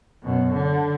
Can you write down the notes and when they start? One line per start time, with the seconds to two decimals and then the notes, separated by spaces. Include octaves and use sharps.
0.23 F#2 B2
0.54 D3